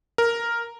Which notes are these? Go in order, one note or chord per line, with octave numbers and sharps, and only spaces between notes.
A#4